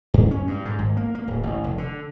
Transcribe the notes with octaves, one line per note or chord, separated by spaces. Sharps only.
F#2
C#4
G2
G#2
G#1
A#3
A#3
D1
A1
F1
D3